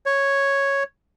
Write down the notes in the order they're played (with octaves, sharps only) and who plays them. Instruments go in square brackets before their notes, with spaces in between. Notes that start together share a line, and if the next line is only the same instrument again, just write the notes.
[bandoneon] C#5